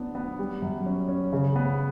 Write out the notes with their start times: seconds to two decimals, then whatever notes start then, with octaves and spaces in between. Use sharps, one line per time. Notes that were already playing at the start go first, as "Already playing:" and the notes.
Already playing: F#3 B3 D4
0.15 B3
0.39 G3
0.62 F#2
0.86 C#4
1.08 C#4
1.33 C#3
1.56 B3